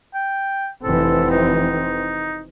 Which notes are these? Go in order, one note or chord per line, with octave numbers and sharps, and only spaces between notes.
G5
F1 E3 C4 A4
D#4